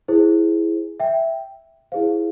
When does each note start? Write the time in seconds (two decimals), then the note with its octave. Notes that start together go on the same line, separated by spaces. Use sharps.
0.08 E4 G#4 C5
1.00 E5 G5
1.92 E4 G#4 C5 F5